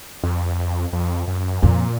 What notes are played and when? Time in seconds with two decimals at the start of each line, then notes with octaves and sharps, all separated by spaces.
0.23 F2
0.93 F2
1.27 F#2
1.62 F2 A#2